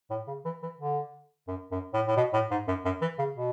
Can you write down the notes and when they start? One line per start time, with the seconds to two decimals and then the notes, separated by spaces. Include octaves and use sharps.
0.10 A2
0.27 C#3
0.45 E3
0.63 E3
0.79 D3
1.48 F#2
1.71 F#2
1.94 A2
2.07 A2
2.17 B2
2.33 A2
2.51 G#2
2.68 F#2
2.85 F#2
3.01 E3
3.18 C#3
3.37 B2